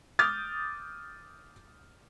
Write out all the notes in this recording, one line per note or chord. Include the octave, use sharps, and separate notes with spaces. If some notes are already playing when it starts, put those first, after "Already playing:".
D6 D#6 F6 G6 A6